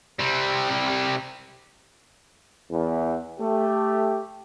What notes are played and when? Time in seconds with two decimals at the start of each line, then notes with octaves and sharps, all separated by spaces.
0.19 C3 G3
2.71 E2
3.40 A3 G4